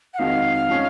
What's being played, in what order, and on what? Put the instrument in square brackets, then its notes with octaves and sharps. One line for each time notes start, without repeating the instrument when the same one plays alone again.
[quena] F#5
[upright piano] F2 D#3 G#3 D#4 F#4 [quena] F5
[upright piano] F3 G#3 C#4